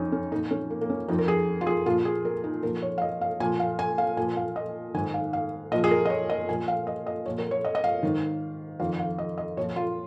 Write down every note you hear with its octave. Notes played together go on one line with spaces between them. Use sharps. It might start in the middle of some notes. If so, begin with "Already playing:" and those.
Already playing: F2 C#4 D#4
C#4
A#2 F3 D#4
C#4
A#3
A#3
C#4
F2 F3 D#4
A#4
G#4
F4
G#4
A#2 F3 F4
G#4
A#4
D#4
A#2 F3 A#4
C#5
F5
D#5
F5
A#2 F3 G#5
F5
G#5
F5
A#2 F3 G#5
F5
D#5
G#2 D#3 G#5
F5
F5
A#2 F3 D#5
G#4
A#4
D#5
C#5
D#5
A#2 F3 G#5
F5
D#5
D#5
A#2 F3 C#5
A#4
C#5
D#5
D#5
F5
G#2 D#3
F2 D#3 F5
F5
D#5
D#5
A#2 F3 C#5
F4